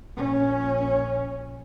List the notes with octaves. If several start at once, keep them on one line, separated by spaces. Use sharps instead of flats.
A#1 C#4